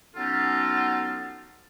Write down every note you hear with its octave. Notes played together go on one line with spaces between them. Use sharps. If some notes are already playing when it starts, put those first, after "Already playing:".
F#3 B3 C#4 D#4 F4 A4